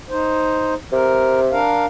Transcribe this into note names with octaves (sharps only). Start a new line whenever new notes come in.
D#4 C5
C3 A#4
D4 A#4 F5